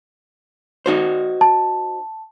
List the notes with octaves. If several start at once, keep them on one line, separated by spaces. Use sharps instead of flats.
D#4 F#4 C5
A5